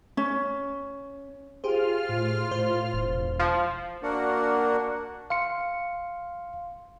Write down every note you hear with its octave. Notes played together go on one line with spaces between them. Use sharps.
C#4
F4 G4 G#4 C5 F6
A2
A2 C5
E1
F3
A#3 D4 F#4 A#4 F#5
F5 C6 C#7